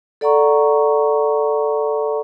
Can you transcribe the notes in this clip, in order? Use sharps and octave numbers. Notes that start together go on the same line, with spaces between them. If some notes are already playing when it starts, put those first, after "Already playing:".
A4 D5 F#5 A#5 C#6